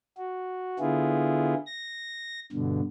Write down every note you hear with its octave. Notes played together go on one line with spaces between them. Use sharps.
F#4
D3 B3 E4 F4 G#4
A#6
G2 B2 D3